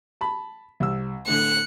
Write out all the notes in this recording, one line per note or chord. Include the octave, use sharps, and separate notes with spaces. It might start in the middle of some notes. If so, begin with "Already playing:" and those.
A5 B5
C2 E6
A2 D3 F#6 C#7